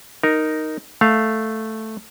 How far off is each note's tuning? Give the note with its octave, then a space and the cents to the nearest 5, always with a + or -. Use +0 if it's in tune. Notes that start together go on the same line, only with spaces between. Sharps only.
D#4 +0 A#4 +0
A3 +0 F5 +0